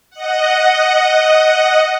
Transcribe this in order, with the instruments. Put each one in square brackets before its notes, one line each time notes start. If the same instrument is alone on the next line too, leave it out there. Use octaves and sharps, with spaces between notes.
[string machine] D#5 F#5